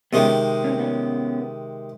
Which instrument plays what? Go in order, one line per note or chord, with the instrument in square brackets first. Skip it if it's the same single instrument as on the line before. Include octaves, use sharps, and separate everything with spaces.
[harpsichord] C3 D#3 G#3 [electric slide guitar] B3 C#4
[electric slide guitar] C#4
C4
B3 C#4